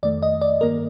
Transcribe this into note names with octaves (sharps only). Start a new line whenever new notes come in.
F2 D#3 A3 D5
D#5
D5
G2 D#3 A#3 A#4